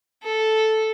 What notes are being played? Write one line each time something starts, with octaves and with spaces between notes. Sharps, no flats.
A4